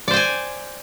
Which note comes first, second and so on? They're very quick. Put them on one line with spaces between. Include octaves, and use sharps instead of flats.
D5 C5 G5 G#5